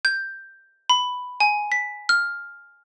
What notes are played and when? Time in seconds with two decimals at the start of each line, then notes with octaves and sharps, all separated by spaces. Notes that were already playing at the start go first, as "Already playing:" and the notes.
0.05 G6
0.89 B5
1.40 G#5
1.72 B6
2.09 F6